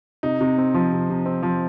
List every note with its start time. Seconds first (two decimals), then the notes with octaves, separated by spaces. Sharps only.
0.23 C3 D#4
0.41 C3
0.58 C4
0.74 F3
0.92 C3
1.10 C3
1.26 C4
1.43 F3